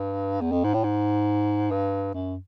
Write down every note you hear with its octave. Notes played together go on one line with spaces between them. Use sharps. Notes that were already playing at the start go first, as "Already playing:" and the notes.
Already playing: G2
E2
F2
G#2
A2
G#2
G2
F#2